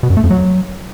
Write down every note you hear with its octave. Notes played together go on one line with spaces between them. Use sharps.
B2
F#2
A3
F2
F#3